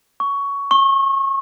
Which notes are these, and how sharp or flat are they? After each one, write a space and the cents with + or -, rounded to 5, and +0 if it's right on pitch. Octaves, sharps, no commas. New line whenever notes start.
C#6 +15
C#6 -30